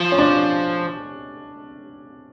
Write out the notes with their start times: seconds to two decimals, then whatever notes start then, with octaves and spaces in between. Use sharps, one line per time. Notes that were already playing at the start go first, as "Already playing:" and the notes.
Already playing: F3
0.12 C#4
0.18 D4